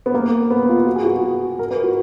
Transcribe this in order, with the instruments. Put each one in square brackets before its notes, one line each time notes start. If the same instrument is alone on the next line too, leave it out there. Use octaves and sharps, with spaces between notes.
[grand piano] B3
A#3
B3
F4
F#4
G#4
F#4
A#4
B4
F#4